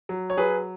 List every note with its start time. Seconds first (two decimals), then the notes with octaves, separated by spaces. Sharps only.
0.09 F#3
0.30 C#5
0.37 F#3 G#4 B4